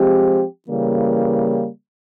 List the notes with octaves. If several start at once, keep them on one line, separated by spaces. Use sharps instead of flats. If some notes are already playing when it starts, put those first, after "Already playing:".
Already playing: F3 G#3 C4 G4
C#3 E3 G3 A#3